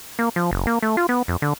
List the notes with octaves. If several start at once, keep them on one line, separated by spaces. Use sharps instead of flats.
A#3
F3
F#1
A#3
A3
F4
B3
F2
D3